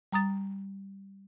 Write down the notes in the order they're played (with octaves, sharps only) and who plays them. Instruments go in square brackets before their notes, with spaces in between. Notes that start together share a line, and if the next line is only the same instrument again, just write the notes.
[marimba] G3 A#5 D#6 A6